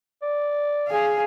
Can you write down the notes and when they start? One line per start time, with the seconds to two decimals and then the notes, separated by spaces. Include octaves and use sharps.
0.22 D5
0.88 G#4 F5